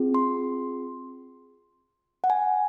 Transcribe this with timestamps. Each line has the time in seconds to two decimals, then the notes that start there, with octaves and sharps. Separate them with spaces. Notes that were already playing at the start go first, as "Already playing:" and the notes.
Already playing: C4 F4 G#4
0.14 C6
2.24 F#5
2.30 G#5